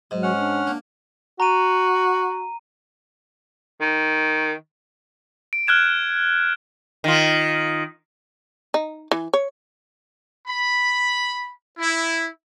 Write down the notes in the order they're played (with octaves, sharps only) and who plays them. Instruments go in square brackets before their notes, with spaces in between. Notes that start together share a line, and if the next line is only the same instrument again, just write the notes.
[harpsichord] G#2 [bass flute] F#3
[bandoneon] C#4 F#5 F6
[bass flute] D4
[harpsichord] A#3
[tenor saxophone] F#4 [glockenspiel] A#5 D#7
[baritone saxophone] D#3
[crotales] D7
F6 F#6 G#6 E7
[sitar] D#3 F4
[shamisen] D#4
E3
C#5
[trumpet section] B5
E4